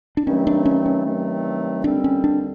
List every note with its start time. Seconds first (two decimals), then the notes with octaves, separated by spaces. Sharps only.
0.17 D4
0.26 G2 D#3 F#3 A3 C4 C#4
0.47 D4
0.65 C#4
0.86 C#4
1.05 G2 D#3 F#3 A3 C4
1.84 D#2 D3 G3 C4 D4
2.04 C#4
2.24 D4